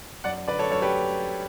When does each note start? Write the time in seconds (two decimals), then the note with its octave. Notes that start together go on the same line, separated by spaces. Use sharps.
0.24 F#2 D5 F#5
0.48 D3 B4 D5
0.59 A4 C#5
0.70 F#2 A4 C#5
0.82 G4 B4